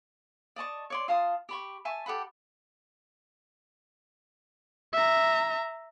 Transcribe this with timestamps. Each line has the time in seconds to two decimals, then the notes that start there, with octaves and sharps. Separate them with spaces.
0.56 D5 D#5 A5 C#6
0.90 C#5 D5 C6
1.08 F4 F5 A5 D#6
1.49 G4 B5 C#6
1.85 E5 G#5 A5 C#6
2.06 G4 A4 F#5 B5
4.93 E5 A#5